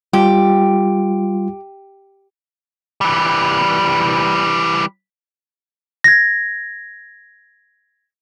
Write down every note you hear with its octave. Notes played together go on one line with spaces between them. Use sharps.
G3 F4 G4
E3 G3
G#6 A#6